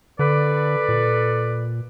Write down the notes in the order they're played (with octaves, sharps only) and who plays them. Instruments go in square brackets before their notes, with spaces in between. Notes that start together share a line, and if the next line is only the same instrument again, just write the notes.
[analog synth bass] D3 [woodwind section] A4 B4 D5
[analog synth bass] A#2